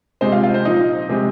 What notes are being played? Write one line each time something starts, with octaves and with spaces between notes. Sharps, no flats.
C3 G#3 C4 C5
F4 F5
F4 F5
C4 C5
A#2 F3 C4 D#4 D#5
C3 G#3 C4